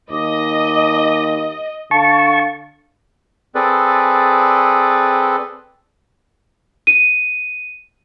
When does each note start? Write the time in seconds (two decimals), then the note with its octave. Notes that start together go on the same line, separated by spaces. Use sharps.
0.11 D#2 D#5 D6
1.91 D3 F5 A5 C#6
3.55 C4 G#4 A4 B4 D5
6.87 D#7